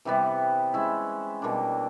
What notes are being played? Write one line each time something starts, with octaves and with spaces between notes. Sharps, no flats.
C3 E3 G3 B3
G#3 C#4 E4
B2 G3 A#3 D4